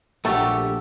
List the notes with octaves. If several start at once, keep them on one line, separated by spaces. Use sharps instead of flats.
A#1 A3 F#4 G4 A4